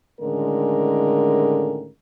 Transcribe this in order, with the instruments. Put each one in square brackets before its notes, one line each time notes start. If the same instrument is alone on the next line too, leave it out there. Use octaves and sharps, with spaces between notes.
[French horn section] A2 D3 D#3 G#3 C#4 A#4